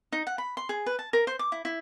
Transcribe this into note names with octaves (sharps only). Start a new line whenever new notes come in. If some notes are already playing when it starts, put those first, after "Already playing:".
D#4
F#5
B5
C6
G#4
B4
A5
A#4
C5
D6
E4
E4